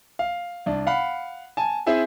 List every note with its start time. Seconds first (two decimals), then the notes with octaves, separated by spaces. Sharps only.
0.19 F5
0.66 C2 D4
0.87 F5 F#5 B5
1.57 G#5 A5
1.86 C4 E4 G#4 E5 G#5